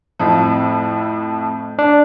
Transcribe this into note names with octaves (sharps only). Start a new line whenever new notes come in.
F2 A2 F3
D4